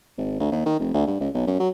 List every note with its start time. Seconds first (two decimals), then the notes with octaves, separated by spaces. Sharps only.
0.18 G#1
0.40 D2
0.52 D#2
0.66 D#3
0.80 F1
0.94 D2
1.07 G2
1.20 C#2
1.34 B1
1.47 F#2
1.60 F#3